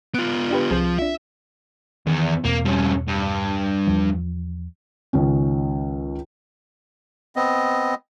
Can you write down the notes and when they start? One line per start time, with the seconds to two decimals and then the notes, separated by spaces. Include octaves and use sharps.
0.14 B3 F4 F#6 D7
0.51 D4 G4 B4
0.71 C2 F3 C4 G#4
0.99 D4 F4 E5
2.07 E2 D#3
2.45 E2 B2 A#3 C4
2.65 G2 C#4
3.08 G2
3.87 E2 F3
5.13 C#2 D#3 C#4
7.36 B3 C4 D#5